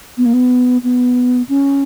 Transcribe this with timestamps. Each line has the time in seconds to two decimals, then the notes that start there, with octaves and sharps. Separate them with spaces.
0.18 B3
0.26 A#3
0.33 B3
0.83 B3
1.49 C#4